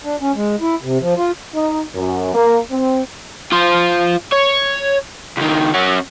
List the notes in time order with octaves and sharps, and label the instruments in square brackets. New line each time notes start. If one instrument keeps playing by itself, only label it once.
[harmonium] D4
C#4
G#3
E4
C3
F3
F4
[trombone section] D#4
F#2
A#3
C4
[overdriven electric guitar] F4 C5
C#5
C#2 D#3
C#4 F#4